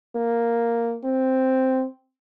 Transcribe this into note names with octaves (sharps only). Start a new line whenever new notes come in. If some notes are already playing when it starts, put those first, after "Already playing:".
A#3
C4